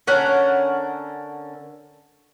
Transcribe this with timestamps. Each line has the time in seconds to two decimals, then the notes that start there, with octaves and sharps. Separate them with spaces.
0.07 D3 C#4 A#4 F#5